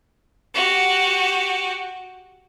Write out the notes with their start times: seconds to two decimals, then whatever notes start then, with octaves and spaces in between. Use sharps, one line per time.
0.54 F#4 G4